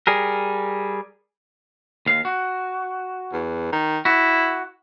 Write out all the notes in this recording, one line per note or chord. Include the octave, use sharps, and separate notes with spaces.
G3 G#4 A#4
D#2 F5
F#4
E2
D#3
E4 F#4